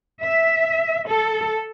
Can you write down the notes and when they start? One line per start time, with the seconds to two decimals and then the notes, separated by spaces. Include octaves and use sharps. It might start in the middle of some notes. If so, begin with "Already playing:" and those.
0.23 E5
1.09 A4